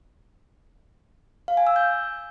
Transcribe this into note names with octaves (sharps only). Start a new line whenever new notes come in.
F5
G#5
E6
G6